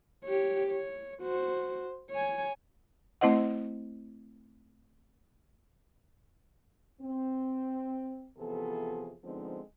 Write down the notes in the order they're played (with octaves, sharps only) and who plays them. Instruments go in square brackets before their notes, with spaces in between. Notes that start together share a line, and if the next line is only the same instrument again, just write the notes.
[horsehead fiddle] G4 C#5
C#5
F#4 C5
C#5 G#5
[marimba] A3 C4 E4 C5 D#5 F#5
[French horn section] C4
C3 E3 F3 B3 G#4 A4
D3 F3 G#3 B3 C4 D#4